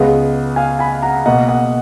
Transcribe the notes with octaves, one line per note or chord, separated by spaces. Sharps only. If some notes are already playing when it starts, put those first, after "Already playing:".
Already playing: C#2 C#3 G#3 B3 D#5 F#5
F5 G#5
G#5 B5
F#5 A#5
B2 A#3 D#5 F#5
D#5 F#5